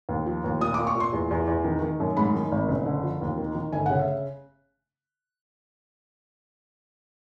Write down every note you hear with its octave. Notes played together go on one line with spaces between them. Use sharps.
D#2
F3
D#2
A#2 D#6
A#2 D6
C#6
A#2
C6
E2
E2
E2
D#3
D#3
F#2
G#2 B5
D#3
G#1
F#1
D3
F3
D#2
D#3
D#3
G1 G#5
C#3 F#5
E5